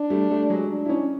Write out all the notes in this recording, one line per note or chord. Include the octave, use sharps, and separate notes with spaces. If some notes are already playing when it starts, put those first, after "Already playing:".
Already playing: D4
G3 A3
G3 A3
F#3 G#3
D4
E4
C#4 D#4